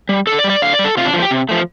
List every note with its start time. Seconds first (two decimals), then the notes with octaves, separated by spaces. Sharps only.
0.09 G3
0.27 D3 A4
0.39 D5
0.44 G3
0.50 D5
0.62 D3 F5
0.73 D5
0.79 G3
0.84 A4
0.97 C3 F4
1.05 D4
1.13 F3 F4
1.18 A3
1.22 G4
1.31 C3
1.49 F3 A3